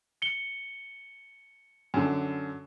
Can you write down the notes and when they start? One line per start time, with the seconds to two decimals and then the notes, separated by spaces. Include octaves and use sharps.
0.22 C#7 G7
1.94 F#2 D3